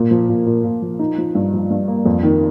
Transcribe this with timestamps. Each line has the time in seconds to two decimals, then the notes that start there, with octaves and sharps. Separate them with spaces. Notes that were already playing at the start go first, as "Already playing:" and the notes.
Already playing: A#2 A#3
0.11 F3
0.29 A#2
0.46 A#2
0.64 A#2
0.82 F3
0.99 D#4
1.18 F3
1.35 G2
1.53 F3
1.70 G2
1.88 A#3
2.06 F2
2.23 D#3